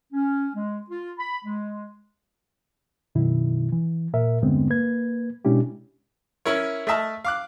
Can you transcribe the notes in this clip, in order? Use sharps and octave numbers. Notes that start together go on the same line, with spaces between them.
C#4
G#3
F4
B5
G#3
F#2 B2 D#3 E4
E3
A#2 A#4 E5
E2 G2 D3 G#3 B3 C4
A#3 B4 G#6
B2 G#3 C#4 D4 E4 G4
C#4 E4 A#4 C#5
A3 D#5 E5 A5 F6
F5 D6 F#6